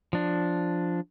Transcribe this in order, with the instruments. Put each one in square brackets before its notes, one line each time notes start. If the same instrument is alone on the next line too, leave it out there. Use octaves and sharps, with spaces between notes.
[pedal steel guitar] F3 D4